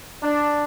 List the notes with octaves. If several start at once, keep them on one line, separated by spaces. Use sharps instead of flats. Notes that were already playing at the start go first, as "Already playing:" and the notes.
D4